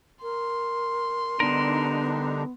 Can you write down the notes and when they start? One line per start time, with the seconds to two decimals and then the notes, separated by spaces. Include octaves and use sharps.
0.22 A#4 C6
1.40 D3 G3 B3 D4 D#4 A#4